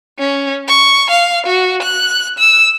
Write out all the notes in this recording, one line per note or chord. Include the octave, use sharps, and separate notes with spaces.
C#4
C#6
F5
F#4
F#6
E6